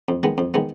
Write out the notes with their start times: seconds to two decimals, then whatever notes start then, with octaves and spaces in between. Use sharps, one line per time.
0.09 F2
0.23 D#3 G#3 B3
0.38 F2
0.54 D#3 G#3 B3